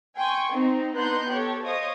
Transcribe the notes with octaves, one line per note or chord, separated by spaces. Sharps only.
G5 G#5 C6 C#6
C4 D#4
B3 D4 D#4 C6 F#6 G6
G4 A4 C#5
C5 C#5 D#5 F5 D#6